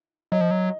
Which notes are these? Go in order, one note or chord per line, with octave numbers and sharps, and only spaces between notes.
F#3 D#5
F3
F#3